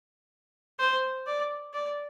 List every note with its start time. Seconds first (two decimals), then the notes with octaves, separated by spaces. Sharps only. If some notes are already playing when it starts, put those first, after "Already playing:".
0.79 C5
1.27 D5
1.74 D5